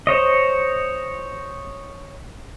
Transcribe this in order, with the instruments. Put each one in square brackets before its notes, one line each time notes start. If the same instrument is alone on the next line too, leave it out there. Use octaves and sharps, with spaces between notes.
[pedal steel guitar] C5 C#5 D#5